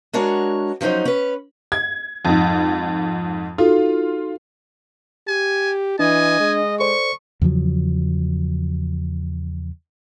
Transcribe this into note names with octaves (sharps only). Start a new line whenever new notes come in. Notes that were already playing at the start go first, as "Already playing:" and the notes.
G#3 D4 F#4 A#4 C#5
F3 F#3 C#4 D#4 C5
C#4 B4
G#6
F2 G#2
D#4 F4 F#4 A4
G4 G#5
E3 D4 D#5 G#5
G#3
A4 C5 D5 C#6
E2 C#3 F3 F#3